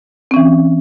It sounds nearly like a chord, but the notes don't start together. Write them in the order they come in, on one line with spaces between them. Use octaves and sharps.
C4 C#4 E3